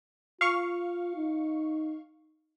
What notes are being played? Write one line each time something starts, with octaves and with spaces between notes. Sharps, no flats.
F4 F5 C#6
D#4